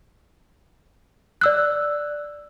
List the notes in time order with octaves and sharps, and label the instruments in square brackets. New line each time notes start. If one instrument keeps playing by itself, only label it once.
[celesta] D5 E6 F#6